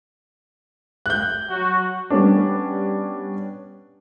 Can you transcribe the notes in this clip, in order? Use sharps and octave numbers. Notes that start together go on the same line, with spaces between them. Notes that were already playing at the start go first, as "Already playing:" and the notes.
F#6 G6
F#3 F#4
G3 B3 C#4 D4